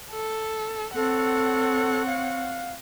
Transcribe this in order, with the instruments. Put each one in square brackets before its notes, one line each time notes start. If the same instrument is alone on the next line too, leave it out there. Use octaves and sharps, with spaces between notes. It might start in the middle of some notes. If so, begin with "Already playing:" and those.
[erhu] A4
[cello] C4 C#5 [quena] A4 [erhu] F#5
[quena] F5